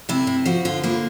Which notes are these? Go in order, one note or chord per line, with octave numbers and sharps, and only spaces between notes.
C3 E4
C3
F3 F#4
D3 F4
A#3 E4